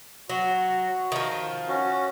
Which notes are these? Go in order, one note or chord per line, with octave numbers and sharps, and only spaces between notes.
F#3 F#4
D#3 F3
C#4 F#4